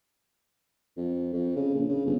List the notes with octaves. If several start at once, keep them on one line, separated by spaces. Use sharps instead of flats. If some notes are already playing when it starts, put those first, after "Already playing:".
F2
F2
C#3
A#1
C#3
G1